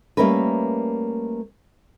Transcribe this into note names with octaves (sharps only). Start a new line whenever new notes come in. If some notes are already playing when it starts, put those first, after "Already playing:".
G3 A3 A#3 C#4 A#4 B4